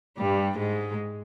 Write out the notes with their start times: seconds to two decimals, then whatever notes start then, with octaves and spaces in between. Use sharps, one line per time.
0.18 G2 G3
0.58 G#2 G#3